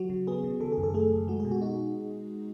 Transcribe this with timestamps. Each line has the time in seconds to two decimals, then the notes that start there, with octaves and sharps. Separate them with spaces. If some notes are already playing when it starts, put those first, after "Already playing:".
Already playing: F#3 F#4
0.10 C#3
0.27 B3 G#4
0.44 C#3
0.60 D#3 A4
0.72 G#4
0.78 F#2
0.83 A4
0.94 A3 G#4
1.11 F#2
1.28 G#3 F#4
1.40 G#4
1.45 B2
1.51 F#4
1.61 D#4 F#4